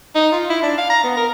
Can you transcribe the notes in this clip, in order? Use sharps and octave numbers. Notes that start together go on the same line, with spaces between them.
D#4
F4
E4
D4
F5
A#5
B3
A#4